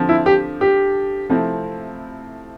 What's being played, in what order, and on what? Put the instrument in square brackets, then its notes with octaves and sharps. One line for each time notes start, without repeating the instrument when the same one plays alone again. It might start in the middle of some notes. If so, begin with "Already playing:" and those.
Already playing: [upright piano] D3 F3 C4
[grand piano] E4
G4
G4
[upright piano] C3 F3 A3 C4 E4